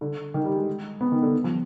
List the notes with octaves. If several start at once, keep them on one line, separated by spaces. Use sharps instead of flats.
D3
D#3
G3
G#3
B3
D#3
D3
F3